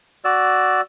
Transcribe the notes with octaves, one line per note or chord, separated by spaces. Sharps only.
F#4 D5 E6